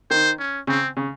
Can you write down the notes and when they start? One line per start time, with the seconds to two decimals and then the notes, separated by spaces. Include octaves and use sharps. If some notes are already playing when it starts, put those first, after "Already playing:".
0.11 D#3 C5
0.39 C#4
0.67 C#3 C4
0.97 C#3